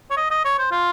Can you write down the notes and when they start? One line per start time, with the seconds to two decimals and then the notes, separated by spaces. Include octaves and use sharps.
0.11 C#5
0.17 D#5
0.31 D#5
0.45 C#5
0.59 C5
0.72 F4